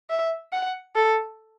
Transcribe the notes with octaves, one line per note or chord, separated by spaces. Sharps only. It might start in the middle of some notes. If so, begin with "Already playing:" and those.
E5
F#5
A4